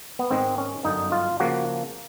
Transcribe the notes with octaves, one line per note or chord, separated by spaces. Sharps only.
B3
G#2 D#3 G#3 C4
C#4
G1 F#2 D3 D#4
F4
C#3 F3 A#3 F#4